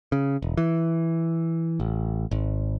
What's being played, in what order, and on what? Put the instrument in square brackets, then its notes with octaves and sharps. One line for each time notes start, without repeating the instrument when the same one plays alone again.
[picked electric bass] C#3
E1
E3
A1
G#1